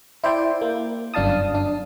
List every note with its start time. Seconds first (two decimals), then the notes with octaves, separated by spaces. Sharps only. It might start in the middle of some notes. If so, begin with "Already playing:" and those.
0.24 E4 C5 D5 G5
0.62 A#3
1.14 G1 F#2 D4 F5 A5 D#6
1.55 D4